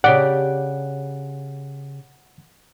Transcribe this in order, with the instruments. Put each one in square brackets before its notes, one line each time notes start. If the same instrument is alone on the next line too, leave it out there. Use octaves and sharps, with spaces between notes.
[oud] C#3 G4 D5 [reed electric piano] F#5